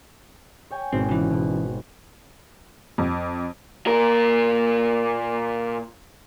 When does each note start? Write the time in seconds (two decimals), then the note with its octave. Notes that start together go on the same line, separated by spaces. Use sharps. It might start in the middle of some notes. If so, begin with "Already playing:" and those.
0.71 C#5 G5 G#5
0.93 G#1 B2 C4 D#4
1.09 C#3 E3 B3 F#6
1.30 B2 B3
2.98 F2
3.87 A#2 A#4